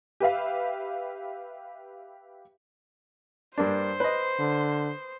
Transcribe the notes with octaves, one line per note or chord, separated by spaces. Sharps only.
G4 B4 E5 F5
G2 A#3 D4 C5
B4 D#5
D3